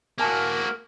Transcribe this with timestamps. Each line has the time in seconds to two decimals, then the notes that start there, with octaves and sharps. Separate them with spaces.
0.18 A#3 F#4 A#4 F5 G#5 A5